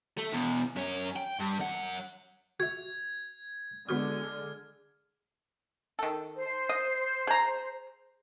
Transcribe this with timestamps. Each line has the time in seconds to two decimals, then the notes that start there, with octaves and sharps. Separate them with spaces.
0.18 A3
0.32 B2 E3
0.76 F#2 C#4
1.16 G5
1.39 G2
1.60 F#2 F#5
2.60 F#4 E5 G#6
3.89 D3 G#3 B3 F#4 D#6 F6
5.99 D#3 A4
6.35 C5
6.69 D#5
7.27 G#4 A#5